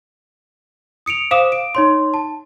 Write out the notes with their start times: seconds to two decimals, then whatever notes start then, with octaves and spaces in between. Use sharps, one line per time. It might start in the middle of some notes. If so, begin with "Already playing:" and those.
1.06 D#6 C#7 D7 F7
1.31 C5 F5 D6 D#6 E7
1.52 D7
1.75 D#4 C#5 C6
2.14 A5